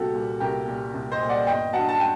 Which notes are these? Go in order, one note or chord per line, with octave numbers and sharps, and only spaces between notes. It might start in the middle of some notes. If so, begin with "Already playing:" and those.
Already playing: C2 A#2 G3 F#4 G4 A4
A#2 G3
C2 G4 A#4
A#2 G3
C2
C5 D#5
A#2 G3
D5 F#5
G1 D#5 G5
G2 F#3 F#5 A5
A5
G5